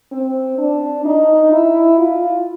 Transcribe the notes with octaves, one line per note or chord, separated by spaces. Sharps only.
C4
D4
D#4
E4
F4